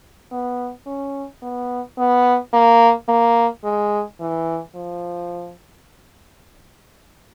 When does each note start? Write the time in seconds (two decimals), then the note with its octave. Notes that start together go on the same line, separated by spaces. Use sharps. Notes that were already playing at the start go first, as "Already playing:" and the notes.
0.32 B3
0.86 C#4
1.42 B3
1.98 B3
2.53 A#3
3.08 A#3
3.64 G#3
4.20 E3
4.75 F3